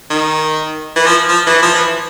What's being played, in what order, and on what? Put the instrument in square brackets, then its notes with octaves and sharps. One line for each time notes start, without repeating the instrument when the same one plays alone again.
[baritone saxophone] D#3
E3
F3
F3
E3
F3
E3